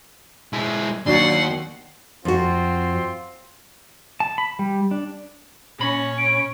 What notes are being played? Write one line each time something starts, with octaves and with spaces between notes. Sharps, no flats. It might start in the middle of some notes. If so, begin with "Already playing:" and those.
G#3 E4
D#2 F#3 D4 F#5 C6
F2 C4 F4 F#4 C6
A5
B5
G3
D4
A#2 C#4 B5
D7